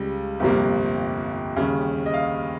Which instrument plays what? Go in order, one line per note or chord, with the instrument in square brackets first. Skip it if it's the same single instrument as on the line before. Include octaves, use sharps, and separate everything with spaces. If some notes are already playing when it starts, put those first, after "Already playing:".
Already playing: [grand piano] C#2 C#3 G3
G1 F2 C3 G3 A#3
D#2 C#3 G3
D#5
F5